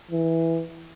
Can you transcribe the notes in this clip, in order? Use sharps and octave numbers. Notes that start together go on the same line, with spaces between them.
E3